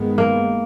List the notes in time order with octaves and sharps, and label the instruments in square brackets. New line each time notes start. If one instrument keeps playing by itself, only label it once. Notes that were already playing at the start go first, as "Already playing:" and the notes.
Already playing: [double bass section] G2 D#3 G#3 B3
[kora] A#3